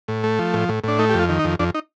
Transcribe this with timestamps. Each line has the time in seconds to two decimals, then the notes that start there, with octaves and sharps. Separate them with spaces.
0.08 A2
0.24 A3
0.39 F3
0.54 A2
0.69 A2
0.84 A2 D4
0.99 A3 D#4
1.09 F2 G4
1.19 F4
1.29 D#3
1.39 D#4
1.45 F2
1.59 F2 D4
1.75 D#4